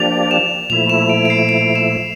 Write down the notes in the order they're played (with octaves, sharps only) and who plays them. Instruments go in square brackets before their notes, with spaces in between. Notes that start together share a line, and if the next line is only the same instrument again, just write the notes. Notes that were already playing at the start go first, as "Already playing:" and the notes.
Already playing: [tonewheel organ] F3 A#3 D4 G4 D5 [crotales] F7
[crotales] E7
[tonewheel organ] A#2 F3 A3 E4 [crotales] F7
[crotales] E7
D7
D7
C7
D7
E7